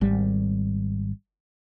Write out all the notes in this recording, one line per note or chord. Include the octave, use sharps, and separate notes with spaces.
G#1 G3